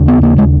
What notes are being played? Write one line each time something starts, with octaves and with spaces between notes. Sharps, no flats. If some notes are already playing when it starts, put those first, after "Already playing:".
Already playing: D#2 C#3
B3
A#3
G#3